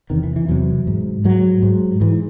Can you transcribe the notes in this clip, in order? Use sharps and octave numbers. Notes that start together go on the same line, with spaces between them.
E2 C3 D#3
E3
E3
E2 C3 F#3
G#2
G#2 F#3
G#2
G#2 E3